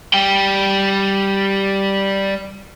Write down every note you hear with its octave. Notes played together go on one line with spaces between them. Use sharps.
G3 G5